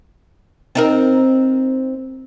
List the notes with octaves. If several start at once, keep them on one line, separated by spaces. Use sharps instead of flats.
C4 D#4 A#4